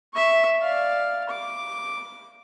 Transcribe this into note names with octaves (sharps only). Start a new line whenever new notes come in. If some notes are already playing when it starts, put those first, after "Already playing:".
E5 C#6
D5 F5
D6